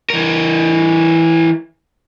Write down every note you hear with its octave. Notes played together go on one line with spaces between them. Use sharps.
E3 A#4